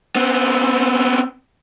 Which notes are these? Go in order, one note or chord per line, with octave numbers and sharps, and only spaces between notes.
B3 C4